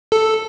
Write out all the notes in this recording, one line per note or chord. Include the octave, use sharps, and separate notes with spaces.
A4